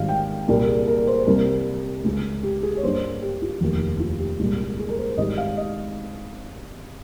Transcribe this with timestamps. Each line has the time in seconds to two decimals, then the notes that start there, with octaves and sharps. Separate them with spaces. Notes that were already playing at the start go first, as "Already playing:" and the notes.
Already playing: G#1 G#2 D#3 G3 F5
0.08 G5
0.48 C2 A#2 G3 A#3 A#4
0.67 G#4
0.87 A#4
1.07 C5
1.27 C2 C3 G3 A#3 A#4
2.04 C#2 C#3 G#3
2.43 G4
2.63 G#4
2.77 C#5
2.83 G2 G3 A#3 C5
3.22 G4
3.42 F4
3.61 F1 D#2 D#3 A#3 G4
4.00 F4
4.19 G4
4.40 C2 A#2 G#3
4.79 G#4
4.89 A#4
4.97 C5
5.17 G#1 G#2 G3 D#5
5.38 F5
5.57 D#5